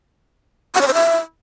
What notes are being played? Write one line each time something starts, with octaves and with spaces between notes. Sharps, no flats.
F#5
C#5
C5
E5